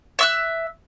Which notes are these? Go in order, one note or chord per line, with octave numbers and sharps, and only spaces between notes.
E5 E6 F#6